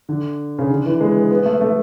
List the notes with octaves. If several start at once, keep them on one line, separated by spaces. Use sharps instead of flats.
D3
C#3
D3
E3
G#3
B3
B3
A3
A3